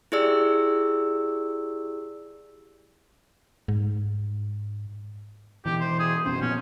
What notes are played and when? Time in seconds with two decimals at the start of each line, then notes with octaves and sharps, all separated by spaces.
0.12 E4 G4 G#4 D5 E6
3.68 G#2
5.66 B2 E3 G4
5.81 C5
5.99 G#4
6.26 F1 B2 C#4 C5
6.41 A#2 F3 B3 C#4